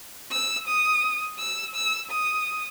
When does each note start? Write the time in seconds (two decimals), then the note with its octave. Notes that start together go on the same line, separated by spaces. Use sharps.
0.32 E6
0.67 D#6
1.39 E6
1.75 E6
2.10 D#6